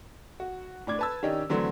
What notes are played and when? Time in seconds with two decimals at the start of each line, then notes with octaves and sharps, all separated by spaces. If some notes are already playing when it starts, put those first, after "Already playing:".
0.40 F#4
0.87 A2 D4 D6 G#6
0.99 B4 A5 E6
1.23 D#3 C#4 D4 G4 D#5
1.50 D3 E3 F#3 A3 C4